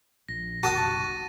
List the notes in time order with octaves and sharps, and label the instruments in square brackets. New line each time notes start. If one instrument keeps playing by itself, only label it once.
[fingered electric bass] A#1 [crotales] A#6
[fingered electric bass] F#1 B1 [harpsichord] F#4 D#6 [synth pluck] A5 [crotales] A6 A#6 D#7